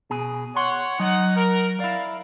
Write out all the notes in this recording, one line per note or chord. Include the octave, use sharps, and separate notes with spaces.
B2 G#4
C#5 F#5 C6
F#3 D#4 F#5
A#4
E4 D5 F5